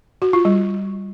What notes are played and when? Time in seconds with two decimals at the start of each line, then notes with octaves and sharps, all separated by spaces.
0.22 F#4
0.33 F4
0.45 G3